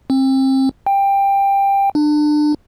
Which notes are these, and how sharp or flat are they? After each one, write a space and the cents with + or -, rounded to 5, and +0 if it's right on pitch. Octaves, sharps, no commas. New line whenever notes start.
C4 +30
G5 +15
D4 +30